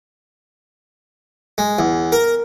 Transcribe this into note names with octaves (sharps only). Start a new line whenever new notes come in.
G#3
E2
A#4